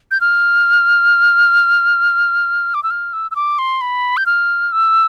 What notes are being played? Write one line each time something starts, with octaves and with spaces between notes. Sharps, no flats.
G6
F6
D6
E6
F6
E6
E6
D6
C6
B5
G6
F6
E6